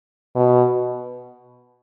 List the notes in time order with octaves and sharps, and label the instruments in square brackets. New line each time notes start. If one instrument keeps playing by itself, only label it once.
[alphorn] B2